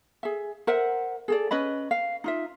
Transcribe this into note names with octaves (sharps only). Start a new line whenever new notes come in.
G#4 E5
A#4 C5 E5 F#5
G#4 A4 D5
C#4 B4 D#5 B5
F5
D#4 F4 E5